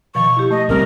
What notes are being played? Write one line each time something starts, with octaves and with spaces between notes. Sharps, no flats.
B2 D#3 F3 C#6
E4 G4
A3 D#5
C2 C3 G3 A#4